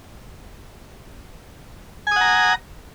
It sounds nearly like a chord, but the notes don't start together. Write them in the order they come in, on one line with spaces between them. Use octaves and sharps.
G#5 D#6 F#5 A#5